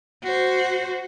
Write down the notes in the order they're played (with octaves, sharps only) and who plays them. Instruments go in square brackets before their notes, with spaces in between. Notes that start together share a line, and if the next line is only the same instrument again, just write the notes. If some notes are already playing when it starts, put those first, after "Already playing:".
[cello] F#4 C5